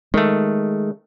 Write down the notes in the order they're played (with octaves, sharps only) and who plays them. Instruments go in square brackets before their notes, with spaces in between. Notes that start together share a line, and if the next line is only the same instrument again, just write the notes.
[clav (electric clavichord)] D#3 A3 [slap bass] G#3